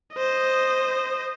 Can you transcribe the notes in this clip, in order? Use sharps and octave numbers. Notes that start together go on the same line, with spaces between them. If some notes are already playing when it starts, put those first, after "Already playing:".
C5 D#5